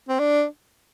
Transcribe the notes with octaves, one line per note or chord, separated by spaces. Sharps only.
C4
D4